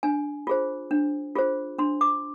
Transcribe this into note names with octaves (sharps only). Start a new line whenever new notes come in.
D4 G#5
F4 G#4 C5
D4
F4 G#4 C5
D4 C6
D6